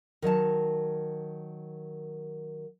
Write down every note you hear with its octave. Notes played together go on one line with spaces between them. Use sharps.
D#3 F#3 D#5 A5